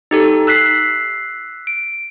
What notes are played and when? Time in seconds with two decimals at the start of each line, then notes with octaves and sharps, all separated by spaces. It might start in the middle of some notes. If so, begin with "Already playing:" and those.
0.11 D#4 G4 A4
0.47 E6 F#6 B6 C7
1.67 D7